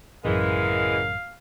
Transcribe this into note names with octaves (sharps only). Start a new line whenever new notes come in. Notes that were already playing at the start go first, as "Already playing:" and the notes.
A1 F#2 C#3 E3 F#3 G#3 A#4 F5